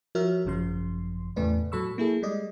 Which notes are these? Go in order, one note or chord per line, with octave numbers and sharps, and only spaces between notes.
F3 F#4 A#4 C#5 E5 F6
G#1 F#2 C#3 F3 C6
E2 A2 C#3 A3 B4 D5
A2 F#3 A4 B5 C#6 E6
A#3 E4 G#4 A4
G3 G#3 D5 D#5